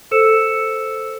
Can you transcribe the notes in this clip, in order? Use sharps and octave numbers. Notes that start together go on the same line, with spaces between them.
A4 C5 E6 C#7 E7